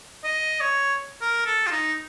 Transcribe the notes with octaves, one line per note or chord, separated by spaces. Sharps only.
D#5
C#5
A#4
A4
F4
D#4